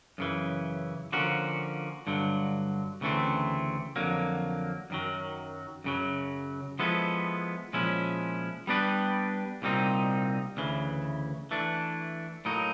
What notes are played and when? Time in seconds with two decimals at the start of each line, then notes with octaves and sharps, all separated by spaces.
0.18 F#2 C#3 E3
1.12 D3 F3 A#3 C#4 F#4
2.07 G2 D3 F#3
3.01 D2 C#3 E3 A3 C4
3.96 F2 D3 F#3 A#3
4.90 F#2 D#3 F#3
5.84 F#2 C#3 F#3
6.79 F3 G#3 B3 E4 A4
7.73 A#2 F3 G#3 C#4 E4
8.67 G3 B3 D4 G4 B4
9.62 C2 A#2 G3 C4 D#4
10.57 D2 C#3 E3
11.51 E3 A3 D4
12.45 A2 F#3 A#3 D#4